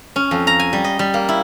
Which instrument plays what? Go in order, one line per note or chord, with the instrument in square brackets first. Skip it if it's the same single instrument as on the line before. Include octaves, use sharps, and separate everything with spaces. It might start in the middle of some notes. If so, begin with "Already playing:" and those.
[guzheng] C#4
F2
A#5
G#5
G3
D#5
G3
A#3
E4